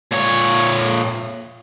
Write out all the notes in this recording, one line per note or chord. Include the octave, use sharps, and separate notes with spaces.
A#2 C#5